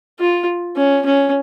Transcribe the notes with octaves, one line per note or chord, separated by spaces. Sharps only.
F4
C#4
C#4